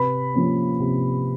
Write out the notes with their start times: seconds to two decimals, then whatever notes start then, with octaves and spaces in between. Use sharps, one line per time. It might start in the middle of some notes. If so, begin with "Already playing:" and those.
Already playing: C3 B4 B5
0.34 F3 A#3 C#4
0.80 C3